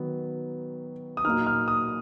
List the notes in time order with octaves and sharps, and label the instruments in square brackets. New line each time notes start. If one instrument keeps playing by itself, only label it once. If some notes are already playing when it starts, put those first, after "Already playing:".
Already playing: [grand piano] D#3 F#3 B3
D#6
A#2 F#3 A#3 D#4 F6
F6
D#6